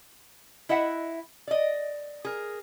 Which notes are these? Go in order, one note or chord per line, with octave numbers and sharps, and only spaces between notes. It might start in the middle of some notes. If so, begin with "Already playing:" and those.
E4 D#5 E5 F#5
D5 D#5
G#4 A#4